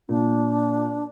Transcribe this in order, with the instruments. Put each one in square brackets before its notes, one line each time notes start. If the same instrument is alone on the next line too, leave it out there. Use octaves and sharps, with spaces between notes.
[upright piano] A#2 [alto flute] D4